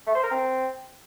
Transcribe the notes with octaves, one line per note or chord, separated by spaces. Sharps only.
A3
C5
A#4
C4